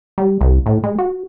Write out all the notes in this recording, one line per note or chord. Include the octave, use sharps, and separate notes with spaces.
G3
C2
A2
G#3
F#4